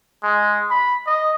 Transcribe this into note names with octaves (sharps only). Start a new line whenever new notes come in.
G#3
B5
D#5